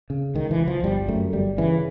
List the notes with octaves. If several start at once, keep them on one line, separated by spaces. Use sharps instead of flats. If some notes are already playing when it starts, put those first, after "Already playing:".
C#3
C#2 D#3
E3
C#2
F3
G1 G3
F#2 A3
G1 G3
C#3 E3